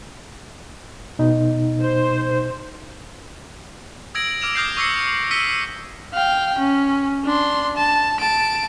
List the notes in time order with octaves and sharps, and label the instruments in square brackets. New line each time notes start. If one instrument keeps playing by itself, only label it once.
[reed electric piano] B2 D#4
[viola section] C5
[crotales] D#6 E6 G#6 A#6 D7 F#7
D6 E6 F6 D7 E7 F7
D6 D#6 F6 G6 A#6 C7
C#6 D6 E6 A#6 C7 C#7
E6 B6 C#7 D#7 G7
E6
[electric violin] F5 G5
C#4
D4 C6
A5
A5 D7